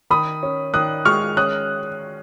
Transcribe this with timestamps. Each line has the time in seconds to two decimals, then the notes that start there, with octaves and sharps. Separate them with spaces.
0.10 D#3 B5 D#6
0.43 C#4
0.74 D#3 D#6 F#6
1.05 G#3 C#6 F6
1.37 C#4 D#6 F#6